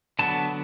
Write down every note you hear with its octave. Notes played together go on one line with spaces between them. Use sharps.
D3 F#3 B3 A5